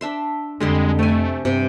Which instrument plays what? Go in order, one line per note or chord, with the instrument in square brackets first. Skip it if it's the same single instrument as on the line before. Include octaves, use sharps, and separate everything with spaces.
[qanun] D4 E5 C6
[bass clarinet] F2 [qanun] D3 G3 C6 [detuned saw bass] G#3
[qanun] C3 G#5 [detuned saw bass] A3
[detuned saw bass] G2 [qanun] C3 C6